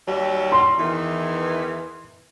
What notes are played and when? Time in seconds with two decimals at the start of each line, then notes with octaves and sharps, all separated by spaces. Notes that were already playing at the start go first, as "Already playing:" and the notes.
0.08 D#2 F#3 G3
0.52 C6
0.79 E2 D#3 E3